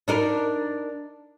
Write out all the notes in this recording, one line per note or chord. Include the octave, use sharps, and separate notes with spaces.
D4 D#4 A#4